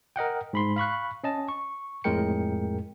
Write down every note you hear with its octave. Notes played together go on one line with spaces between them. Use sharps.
A#4 D#5 F#5 G5
G#2 B5 C6
F5 B5 C#6 F#6
C#4 D#5 A5
C#6
F2 A2 G#3 A#4 G5 C#7